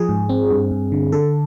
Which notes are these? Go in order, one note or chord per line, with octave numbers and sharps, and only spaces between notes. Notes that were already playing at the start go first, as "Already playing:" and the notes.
Already playing: F3 G#4
G#2
C4
G2
G2
D3
D3 A4